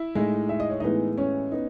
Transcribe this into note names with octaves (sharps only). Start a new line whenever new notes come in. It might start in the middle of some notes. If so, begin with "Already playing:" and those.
Already playing: E4 E5
A2 G#3 D#4
E5
D#5
C#5
A2 E3 G#3 B3 D#4 D#5
C#4 C#5
B3 D#4